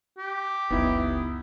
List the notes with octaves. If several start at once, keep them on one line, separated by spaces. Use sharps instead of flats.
G4
F#1 C#2 B3 D#4 E4